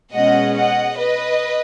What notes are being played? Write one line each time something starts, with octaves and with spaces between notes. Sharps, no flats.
B2 G#3 C#4 D#5 F#5
D#5 F#5
B4 D#5